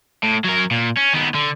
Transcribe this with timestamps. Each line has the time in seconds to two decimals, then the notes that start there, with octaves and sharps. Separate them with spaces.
0.24 A2
0.45 F#3 A#4
0.71 A#2
0.97 C#4
1.13 D#3 B3
1.34 D3